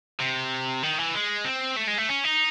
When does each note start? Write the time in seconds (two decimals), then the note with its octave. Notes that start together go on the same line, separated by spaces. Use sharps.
0.20 C3
0.83 D#3
0.98 E3
1.14 G#3
1.45 C4
1.77 A3
1.88 G#3
1.98 A3
2.09 C#4
2.24 D#4